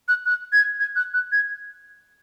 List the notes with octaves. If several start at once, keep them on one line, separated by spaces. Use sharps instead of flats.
F#6
F#6
G#6
G#6
F#6
F#6
G#6